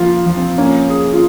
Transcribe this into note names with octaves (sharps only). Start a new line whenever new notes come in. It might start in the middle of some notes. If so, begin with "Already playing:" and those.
Already playing: F3 A#3 F4
F3
C4
A#3 C#4
G#4
F4